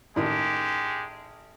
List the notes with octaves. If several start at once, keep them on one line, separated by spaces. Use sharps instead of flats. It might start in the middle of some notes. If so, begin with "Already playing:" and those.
A1 D#3 G#3 G4 D#6